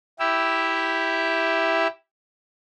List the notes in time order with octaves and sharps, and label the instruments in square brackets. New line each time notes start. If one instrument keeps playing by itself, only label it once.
[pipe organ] E4 G4 E5